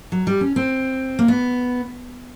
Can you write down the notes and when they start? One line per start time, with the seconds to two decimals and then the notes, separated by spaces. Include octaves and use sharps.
0.12 F#3
0.27 G3
0.41 C#4
0.56 C4
1.19 A#3
1.28 B3